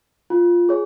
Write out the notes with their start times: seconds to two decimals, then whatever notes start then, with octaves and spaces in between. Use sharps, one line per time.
0.30 F4
0.69 G#4 C#5